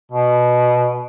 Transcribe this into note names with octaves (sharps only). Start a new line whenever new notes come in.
B2